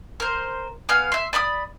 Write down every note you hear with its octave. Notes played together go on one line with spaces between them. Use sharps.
A#4 C5
B3 G#4 F5 F6
E5 C6
D5 B5 C6 D#6